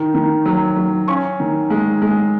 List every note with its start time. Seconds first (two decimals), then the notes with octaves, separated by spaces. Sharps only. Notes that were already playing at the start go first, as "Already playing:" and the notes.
Already playing: D#3
0.14 D#3
0.46 F#3
0.76 F#3
1.08 C#4 C#6
1.40 D#3
1.70 G#3
2.02 G#3